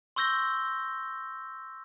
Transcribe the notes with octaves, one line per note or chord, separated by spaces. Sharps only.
C6 C#6 E6 G6 A#6 G7